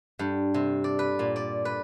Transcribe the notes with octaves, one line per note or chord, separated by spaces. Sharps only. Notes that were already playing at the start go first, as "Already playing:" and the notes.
G2
C3
D5
B4
A#2
D5
B4